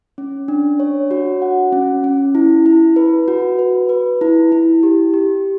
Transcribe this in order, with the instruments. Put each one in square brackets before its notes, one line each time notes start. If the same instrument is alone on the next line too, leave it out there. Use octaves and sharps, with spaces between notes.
[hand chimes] C#4
D4
C#5
F#4
F#5
C#4
C#4
E4
E4
B4
F#4
B4
B4
E4
E4
G4
G4